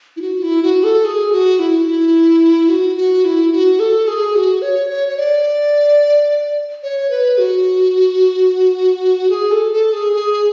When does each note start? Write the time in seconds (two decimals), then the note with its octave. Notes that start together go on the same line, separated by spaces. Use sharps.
0.17 E4
0.22 F#4
0.43 E4
0.63 F#4
0.84 A4
1.05 G#4
1.32 F#4
1.59 E4
1.87 E4
2.69 F#4
2.96 F#4
3.25 E4
3.52 F#4
3.80 A4
4.07 G#4
4.35 F#4
4.62 C#5
4.90 C#5
5.09 C#5
5.17 D5
6.83 C#5
7.10 B4
7.38 F#4
9.30 G#4
9.51 A4
9.72 A4
9.93 G#4
10.14 G#4